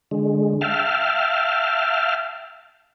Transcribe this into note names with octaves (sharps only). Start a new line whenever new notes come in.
D3 G#3
E5 F5 G5 A5 F6